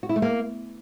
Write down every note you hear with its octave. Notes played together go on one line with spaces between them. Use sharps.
F#4
E4
A3
A#3